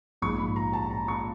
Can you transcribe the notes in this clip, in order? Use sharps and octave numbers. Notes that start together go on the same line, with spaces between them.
A#1 G#2 F3 G#3 C#6
B5
A#5
A5
A#5
C#6